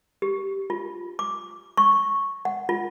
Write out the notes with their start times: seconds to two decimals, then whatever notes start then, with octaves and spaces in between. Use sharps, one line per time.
0.22 G4
0.70 F4
1.19 D6
1.77 C#6
2.45 F#5
2.69 F4